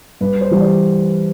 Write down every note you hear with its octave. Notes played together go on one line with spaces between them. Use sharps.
G2 B4
C5
E3 G3
D5